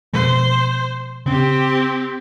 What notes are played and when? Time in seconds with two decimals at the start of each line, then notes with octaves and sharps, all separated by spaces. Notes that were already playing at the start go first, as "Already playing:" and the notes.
0.13 B2 F3 G#3 C5
1.26 C#3 C4 C#4 G4